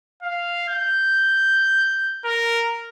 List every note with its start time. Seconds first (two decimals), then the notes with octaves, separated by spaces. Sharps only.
0.23 F5
0.69 G6
2.25 A#4